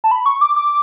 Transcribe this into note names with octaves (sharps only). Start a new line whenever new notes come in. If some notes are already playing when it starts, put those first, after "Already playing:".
A5
B5
C#6
D6
D6